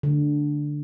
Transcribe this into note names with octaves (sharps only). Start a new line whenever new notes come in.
D3